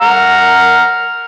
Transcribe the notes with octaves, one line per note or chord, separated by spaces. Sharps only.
F#5 A#5 F6